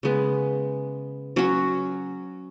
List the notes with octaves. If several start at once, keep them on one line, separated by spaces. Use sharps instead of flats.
C#3 G#3 B3
F#3 C#4 F#4